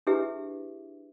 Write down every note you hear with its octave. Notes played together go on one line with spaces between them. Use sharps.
D4 E4 G4 G#4 B4 E5